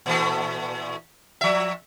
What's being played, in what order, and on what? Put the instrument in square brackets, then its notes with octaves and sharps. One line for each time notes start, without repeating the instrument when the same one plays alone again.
[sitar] A#2 E3 A3
F3 E5